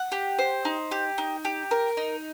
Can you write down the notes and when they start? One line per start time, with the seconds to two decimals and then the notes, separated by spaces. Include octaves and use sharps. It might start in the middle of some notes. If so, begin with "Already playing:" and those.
Already playing: F#5
0.12 G4
0.39 C5
0.65 D#4
0.91 G4
1.18 D#4
1.45 G4
1.71 A#4
1.97 D#4